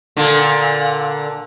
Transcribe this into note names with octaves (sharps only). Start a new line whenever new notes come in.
A#2 D3